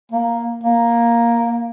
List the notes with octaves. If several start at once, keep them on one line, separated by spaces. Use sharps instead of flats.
A#3
A#3